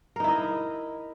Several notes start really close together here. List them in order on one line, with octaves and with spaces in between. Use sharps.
A#4 D#4 E4 D#5